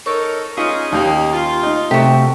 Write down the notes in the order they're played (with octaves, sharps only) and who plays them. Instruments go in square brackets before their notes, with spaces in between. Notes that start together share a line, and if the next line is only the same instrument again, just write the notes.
[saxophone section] D#4 A4 A#4 [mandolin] C#5
[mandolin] C#4 [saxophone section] D#4 G#4 [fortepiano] F4
[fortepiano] D#2 G4 [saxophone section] A#3 D#4
[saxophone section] F4
[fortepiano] D#4
[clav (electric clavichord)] C3 A3 [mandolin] F#4 G4